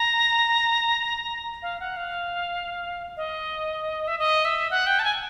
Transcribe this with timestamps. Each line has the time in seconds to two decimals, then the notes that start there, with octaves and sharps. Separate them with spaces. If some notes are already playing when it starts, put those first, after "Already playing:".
Already playing: A#5
1.62 F5
1.80 F#5
1.97 F5
3.17 D#5
4.07 E5
4.19 D#5
4.45 E5
4.71 F#5
4.87 G5
4.99 A5
5.04 G#5